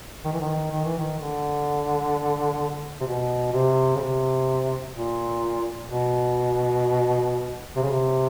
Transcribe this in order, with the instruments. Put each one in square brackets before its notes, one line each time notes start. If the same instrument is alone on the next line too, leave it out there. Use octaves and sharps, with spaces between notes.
[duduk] D#3
E3
D#3
D#3
E3
D#3
D3
C3
B2
C3
C#3
C3
A#2
B2
C3
C#3
C3